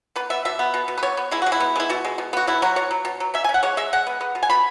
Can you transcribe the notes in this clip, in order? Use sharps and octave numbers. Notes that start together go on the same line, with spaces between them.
B3 B4
B3 E5
B2 E5
B3
B2
B2
B4
B3 C#5
B3
G#3 E4
G#3 F#4
E4
B3
G#3 E4
B2 F#4
G#3
B2
B3 F#4
B2 E4
F#3 F#4
B2 C#5
F#3
B2
F#3
C#4 E5
G#5
C#4
F#5
G#3 C#5
G#3 E5
G#3 F#5
B3
B3
B2
G#5
B2 B5